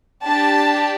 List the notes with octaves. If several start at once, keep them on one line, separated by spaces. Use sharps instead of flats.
D4 G4 A5